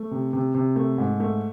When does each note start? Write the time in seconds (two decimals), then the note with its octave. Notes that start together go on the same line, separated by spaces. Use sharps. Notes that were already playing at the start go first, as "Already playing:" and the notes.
Already playing: A3
0.11 C3
0.33 C3
0.55 C3
0.76 A3
0.98 G#2
1.20 A3